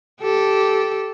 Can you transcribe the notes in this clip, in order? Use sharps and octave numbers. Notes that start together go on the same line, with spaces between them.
G4 A4